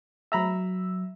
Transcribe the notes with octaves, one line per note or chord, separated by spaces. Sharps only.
F#3 E5 A#5 B5 E6